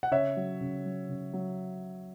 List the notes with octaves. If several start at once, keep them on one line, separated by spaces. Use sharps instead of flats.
F#5
C#3 C#5 E5
F#3
C#3
F#3
C#3
F#3